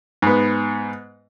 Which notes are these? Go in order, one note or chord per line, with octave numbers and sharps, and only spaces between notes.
G#2 B3